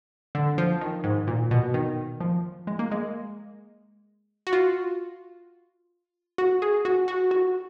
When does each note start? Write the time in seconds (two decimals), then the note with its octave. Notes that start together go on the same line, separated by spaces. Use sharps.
0.35 D3
0.58 F3
0.81 D#3
1.04 G#2
1.27 A#2
1.51 B2
1.74 D#3
2.21 F3
2.67 G#3
2.79 A#3
2.91 G#3
4.47 F#4
4.53 F4
6.38 F#4
6.62 G#4
6.85 F#4
7.08 F#4
7.31 F#4